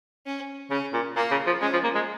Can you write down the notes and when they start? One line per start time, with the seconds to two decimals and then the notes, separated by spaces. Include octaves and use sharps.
0.26 C#4
0.71 C#3 C#4
0.93 A#2
1.16 A#2 A#3
1.31 C#3
1.47 F3
1.61 G#3 C#4
1.73 F3
1.84 A#3
1.95 G#3